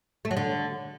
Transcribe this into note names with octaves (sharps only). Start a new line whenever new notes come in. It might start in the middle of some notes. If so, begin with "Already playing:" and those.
A3
F#3
D3